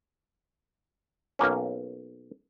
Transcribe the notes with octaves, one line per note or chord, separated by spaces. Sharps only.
B1 A#3 C#4